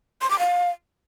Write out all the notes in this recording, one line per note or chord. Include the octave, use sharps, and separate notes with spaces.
C6
D6
F5